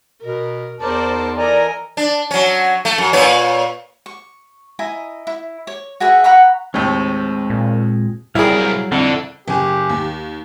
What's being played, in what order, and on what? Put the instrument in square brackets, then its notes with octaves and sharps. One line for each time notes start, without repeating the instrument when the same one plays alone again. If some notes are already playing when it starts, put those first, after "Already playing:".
[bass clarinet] B2 [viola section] A#4
[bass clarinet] E2 [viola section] D#4 C5 D5 [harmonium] A#4 A5
[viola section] E3 A4 D#5 [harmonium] A#4 G#5 A#5 [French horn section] D5
[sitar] D4
F#3 C#4
A3
F#2
A#2 B4 C#5
[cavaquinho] C#6
E4 D#5 G#5 A#5
E4
C#5
F#4 G#4 B4 E5
F#5 A#5 B5 C#6
[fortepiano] D#2 A2 [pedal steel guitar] G#3 C4 G5
[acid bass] A#2
[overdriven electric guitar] C2 A#4 [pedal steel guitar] F#3 F5 [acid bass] G3 [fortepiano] E4 G#4
[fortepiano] F2 [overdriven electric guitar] D3 [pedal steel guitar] C4 E4
[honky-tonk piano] F#1 G#5 [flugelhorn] G4
[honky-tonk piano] D#2